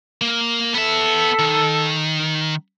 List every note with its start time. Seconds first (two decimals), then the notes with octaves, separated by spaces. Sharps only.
0.21 A#3
0.74 B3 A4 E5
1.39 D#3